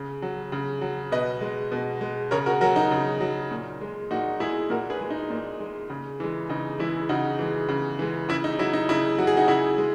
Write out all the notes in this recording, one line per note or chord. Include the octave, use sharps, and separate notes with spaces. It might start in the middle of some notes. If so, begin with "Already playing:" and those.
Already playing: C#3
F#3
C#3
F#3
B2 B4 D#5
G#3
B2
G#3
C#3 A#4 C#5
F#4 A#4
F#3 F#4 A#4
D#4 F#4
C#3
F#3
A#2
G#3
A#2 D#4 F#4
G#3 E4 G#4
A#2 F#4 A#4
G#4 B4
G#3
D#4
A#2
G#3
C#3
E3 G#3
C#3 D#4
E3 G#3 E4
C#3 D#4 F#4
E3 G#3
C#3
E3 G#3
C#3 E4
D#4
F#3 E4
D#4
C#3 E4
F#3 F#4
G#4
D#4 F#4
C#3 E4 G#4
G#3